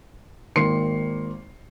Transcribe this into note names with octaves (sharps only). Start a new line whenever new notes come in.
G#1 D#3 A#3 C6 C7 C#7